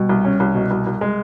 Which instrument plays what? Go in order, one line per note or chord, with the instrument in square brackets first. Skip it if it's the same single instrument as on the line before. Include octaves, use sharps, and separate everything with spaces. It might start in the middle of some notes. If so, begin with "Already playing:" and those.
Already playing: [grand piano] B2 [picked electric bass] G3
[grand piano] C2
C#4
C2
B2
C2
C2
G#3